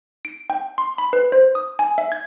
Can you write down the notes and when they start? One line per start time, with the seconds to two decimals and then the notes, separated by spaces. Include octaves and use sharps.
0.25 D7
0.50 G5
0.78 C6
0.98 B5
1.13 B4
1.32 C5
1.55 D#6
1.79 G#5
1.98 E5
2.12 G#6